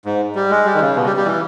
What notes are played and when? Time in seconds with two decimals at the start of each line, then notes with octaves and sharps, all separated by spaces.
0.05 G#2
0.35 G3
0.51 G#3
0.65 G3
0.75 D#3
0.80 C#3
0.96 B2
1.06 G3
1.16 G3
1.25 E3